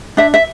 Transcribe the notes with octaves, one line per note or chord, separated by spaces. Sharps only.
D4 E5
E5